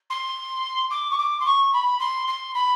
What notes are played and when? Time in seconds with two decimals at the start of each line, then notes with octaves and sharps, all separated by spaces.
0.10 C6
0.90 D6
1.11 C#6
1.18 D6
1.40 C6
1.45 C#6
1.73 B5
1.99 C6
2.27 C6
2.54 B5